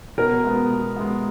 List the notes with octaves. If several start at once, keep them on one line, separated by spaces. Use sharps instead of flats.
B2 A#4
G#3 B3
B2
G#3 B3